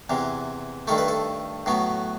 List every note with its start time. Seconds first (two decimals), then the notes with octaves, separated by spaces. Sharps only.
0.10 E2 C3 E3
0.87 G2 D#3 A3 A4
0.98 B4
1.08 A4
1.66 A2 F#3 B3